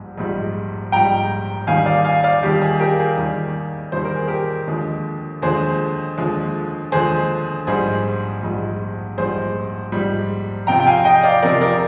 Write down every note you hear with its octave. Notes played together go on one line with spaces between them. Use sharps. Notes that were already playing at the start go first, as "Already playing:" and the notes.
Already playing: A#1 G#2 G3
A#1 G#2 G3
A#1 G#2 G3 G5 A#5
D#2 D#3 G3 F5 G#5
D5 F5
F5 G#5
D5 F5
D#2 D#3 G3 G4
G#4
G4 A#4
G#4
D#2 D#3 G3
D#2 D#3 G3 C5
A#4
G#4
G4 A#4
D#2 D3 F3 G#3
D#2 D3 F3 G#3 G#4 C5
D#2 D3 F3 G#3
D#2 D3 F3 G#3 G#4 C5
A#1 G#2 G3 G#4 C5
A#1 G#2 G3
A#1 G#2 G3 G#4 C5
A#1 G#2 G3
F2 C3 F3 G5 A#5
G5
F5 G#5
D#5 G5
D5 F5
F2 C3 F3 A#4 D5
A#4 D5